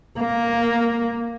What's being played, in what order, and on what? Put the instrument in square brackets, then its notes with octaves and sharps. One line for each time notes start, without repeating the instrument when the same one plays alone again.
[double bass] A#3